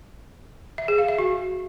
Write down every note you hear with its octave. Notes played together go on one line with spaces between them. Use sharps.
E5
G#4
F5
E5
F#4